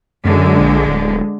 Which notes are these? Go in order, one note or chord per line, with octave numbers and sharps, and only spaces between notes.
F#2 D3 G#3
A#1
D1